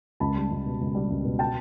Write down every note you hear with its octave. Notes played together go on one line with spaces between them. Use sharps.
C#2 A5 B5
G3
C#2
B2
C#2
G3
C#2
B2
G5 A5